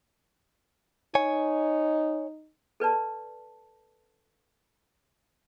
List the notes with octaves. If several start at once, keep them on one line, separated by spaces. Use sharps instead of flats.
D#4 C#5 G#5
A4 B4 D5 A5